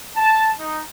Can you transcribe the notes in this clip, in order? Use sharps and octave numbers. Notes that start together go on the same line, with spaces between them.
A5
D#4